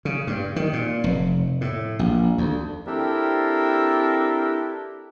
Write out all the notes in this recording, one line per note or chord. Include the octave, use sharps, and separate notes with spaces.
C#3
G2
D#3
A#2
F1
A2
A#1
D2
C4 D4 E4 G4 A4 A#4